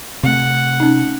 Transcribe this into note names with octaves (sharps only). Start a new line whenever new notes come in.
C3 A3 C4 F#5
C#4 D#4